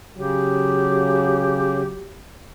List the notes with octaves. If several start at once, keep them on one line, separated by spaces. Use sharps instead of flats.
C#3 F#3 G4